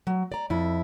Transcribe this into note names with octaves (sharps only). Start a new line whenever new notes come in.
F#3
D5 A#5
F2 E4